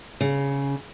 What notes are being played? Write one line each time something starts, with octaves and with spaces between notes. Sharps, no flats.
C#3